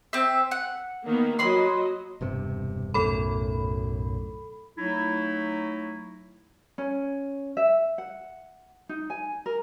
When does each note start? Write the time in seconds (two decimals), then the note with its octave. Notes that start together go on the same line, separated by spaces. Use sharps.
0.13 C4 E5
0.51 F#5
1.07 D#3 A#3 B3
1.39 F#3 D#5 B5 C6
2.21 E1 G2 C3
2.94 B1 F#2 A2 A4 B5
4.78 F#3 A3 D#4 E4
6.78 C#4
7.57 E5
7.98 F#5
8.89 D#4
9.10 G#5
9.46 A#4